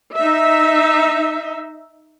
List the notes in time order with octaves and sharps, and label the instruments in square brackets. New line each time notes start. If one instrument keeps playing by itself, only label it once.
[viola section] D#4 E5